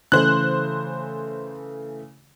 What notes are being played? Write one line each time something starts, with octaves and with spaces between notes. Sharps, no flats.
C#3 E3 A3 C5 F#6